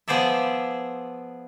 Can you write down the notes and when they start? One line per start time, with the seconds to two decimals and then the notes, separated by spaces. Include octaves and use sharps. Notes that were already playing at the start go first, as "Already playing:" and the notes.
0.08 F3 B3 G#4 C5 D5 E5